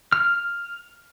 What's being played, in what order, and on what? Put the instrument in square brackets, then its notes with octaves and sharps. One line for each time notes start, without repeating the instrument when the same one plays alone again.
[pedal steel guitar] F6